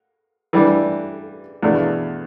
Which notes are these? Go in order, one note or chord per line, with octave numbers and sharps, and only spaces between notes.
E3 G3 D4
E2 B2 A3 D4